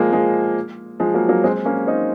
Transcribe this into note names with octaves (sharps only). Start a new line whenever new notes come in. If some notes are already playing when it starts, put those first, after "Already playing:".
Already playing: F3 G#3 A#3
F3 G#3
F3 G#3
F#3 A#3
F#3 A#3
G#3 C4
A#3 C#4
C4 D#4